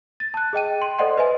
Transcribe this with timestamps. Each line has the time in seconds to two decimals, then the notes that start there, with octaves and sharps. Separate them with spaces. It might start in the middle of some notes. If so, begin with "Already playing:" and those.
0.20 A6
0.34 A5 F#6
0.53 G#4 D#5 G5 D#7
0.82 C6
0.99 A4 C5 D5 D#5 F#5 C6
1.17 B4 D#5 E5 G#5